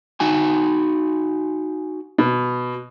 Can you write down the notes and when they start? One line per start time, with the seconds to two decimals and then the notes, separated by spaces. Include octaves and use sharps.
0.20 D#4 F#4 G#5
2.18 B2